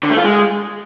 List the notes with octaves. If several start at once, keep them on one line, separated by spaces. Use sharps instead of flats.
D3
A3
F4
G#3